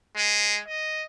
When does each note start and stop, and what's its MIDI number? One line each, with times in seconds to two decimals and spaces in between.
0.16 0.59 56
0.68 1.02 75